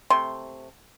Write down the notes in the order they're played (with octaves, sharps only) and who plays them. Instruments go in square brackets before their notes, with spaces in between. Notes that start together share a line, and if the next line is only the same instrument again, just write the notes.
[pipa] C3 A3 C6